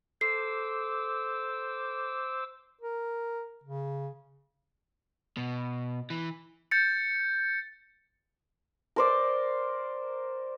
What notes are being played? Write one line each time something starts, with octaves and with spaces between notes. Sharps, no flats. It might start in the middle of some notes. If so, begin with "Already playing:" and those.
A4 C5 D6 E6 C7
A#4
C#3
B2
E3
G6 A6 C#7
A#4 C5 D5